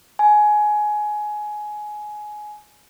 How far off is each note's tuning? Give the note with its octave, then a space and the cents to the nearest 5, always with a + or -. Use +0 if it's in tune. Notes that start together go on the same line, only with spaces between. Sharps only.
G#5 +15